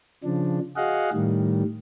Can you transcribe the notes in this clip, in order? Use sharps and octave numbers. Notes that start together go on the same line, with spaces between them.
C#3 F3 D4
F#4 G#4 D#5 F5 F#5
A2 D#3 G3